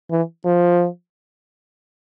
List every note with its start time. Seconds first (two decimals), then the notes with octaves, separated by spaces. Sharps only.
0.11 E3
0.45 F3